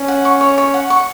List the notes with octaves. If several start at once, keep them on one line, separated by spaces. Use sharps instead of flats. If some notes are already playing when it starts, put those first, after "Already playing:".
Already playing: C#4
F#5
C#6
C#5
C#5
F#5
C#6